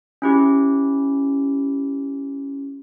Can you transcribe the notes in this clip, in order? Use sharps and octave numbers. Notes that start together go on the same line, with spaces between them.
C#4 E4 G4